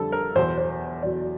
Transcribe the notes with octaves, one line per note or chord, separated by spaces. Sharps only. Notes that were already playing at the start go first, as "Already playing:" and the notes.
Already playing: F2 D3 G3 A4
A#4
E2 B2 F#3 C5
C5
E2 B2 F#3 D5